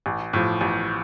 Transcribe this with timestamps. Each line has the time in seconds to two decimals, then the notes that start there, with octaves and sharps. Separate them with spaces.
0.06 A1
0.33 A2 F3
0.61 A1